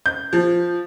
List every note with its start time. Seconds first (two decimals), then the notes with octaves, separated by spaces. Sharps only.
0.06 G6
0.33 F3